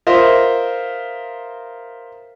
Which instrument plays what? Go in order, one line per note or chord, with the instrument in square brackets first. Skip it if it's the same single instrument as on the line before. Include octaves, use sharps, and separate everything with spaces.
[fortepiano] F4 A#4 C5 D#5 E5